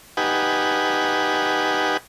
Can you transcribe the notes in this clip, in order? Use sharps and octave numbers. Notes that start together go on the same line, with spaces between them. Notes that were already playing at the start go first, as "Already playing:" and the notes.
D#4 G4 B4 F#5 G#5